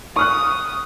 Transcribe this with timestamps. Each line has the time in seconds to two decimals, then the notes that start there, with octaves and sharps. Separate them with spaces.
0.16 C#6 D#6 F6 F#6